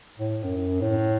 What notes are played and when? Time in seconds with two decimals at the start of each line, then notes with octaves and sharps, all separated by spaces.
0.19 A2
0.44 F#2
0.81 A2